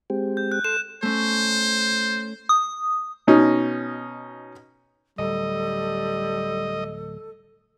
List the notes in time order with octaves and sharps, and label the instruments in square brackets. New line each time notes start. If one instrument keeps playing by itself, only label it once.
[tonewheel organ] G#3 C4 G4
[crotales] G6
F#6
[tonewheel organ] A4 C6 [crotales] E7
[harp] A3 C#4 [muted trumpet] C5
[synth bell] D#6
[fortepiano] B2 C#4 D#4
[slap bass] D1 [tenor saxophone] G3 [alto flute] A4 [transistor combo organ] D#5